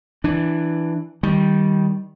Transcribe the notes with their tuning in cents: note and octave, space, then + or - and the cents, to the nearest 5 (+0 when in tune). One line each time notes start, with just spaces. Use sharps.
E3 +0 D4 +10
D#3 +10 G3 -5